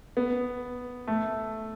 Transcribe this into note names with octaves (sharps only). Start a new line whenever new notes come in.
B3
A3